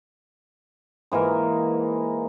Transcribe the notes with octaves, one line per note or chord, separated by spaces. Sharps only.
G#2 E3 A#3 A#4